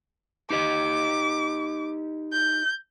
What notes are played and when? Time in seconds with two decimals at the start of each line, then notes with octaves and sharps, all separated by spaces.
0.50 D#4 G4 D#5 D6
2.33 G6